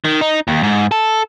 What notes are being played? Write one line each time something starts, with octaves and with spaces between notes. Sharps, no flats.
D#3
D#4
D#2
G#2
A4